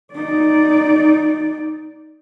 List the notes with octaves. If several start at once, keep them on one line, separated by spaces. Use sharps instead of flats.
D#4 D5